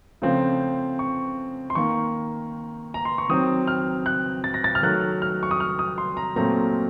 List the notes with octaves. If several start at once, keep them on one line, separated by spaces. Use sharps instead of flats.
C#3 F3 A3 C4
C#6
C6
D#3 A#3 C#6
A#5
C6
C#6
D#3 F#3 C4 D#6
F6
F#6
A6
A#6
A6
F6
D#3 F#3 A3 F#6
F6
C#6
D#6
F6
D#6
C6
A#5
A#2 F#3 A3 C4 A#5